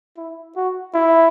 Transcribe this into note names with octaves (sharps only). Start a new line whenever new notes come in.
E4
F#4
E4